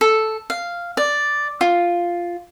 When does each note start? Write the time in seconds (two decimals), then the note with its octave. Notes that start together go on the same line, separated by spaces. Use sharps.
0.01 A4
0.50 F5
0.97 D5
1.61 F4